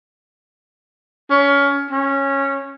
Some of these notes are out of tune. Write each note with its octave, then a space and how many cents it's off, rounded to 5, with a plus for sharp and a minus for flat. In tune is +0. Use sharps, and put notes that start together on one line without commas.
C#4 +20
C#4 -10